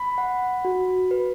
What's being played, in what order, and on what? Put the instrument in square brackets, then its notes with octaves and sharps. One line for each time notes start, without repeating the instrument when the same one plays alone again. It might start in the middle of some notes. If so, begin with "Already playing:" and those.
Already playing: [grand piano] B5
[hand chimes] F#5
F#4
B4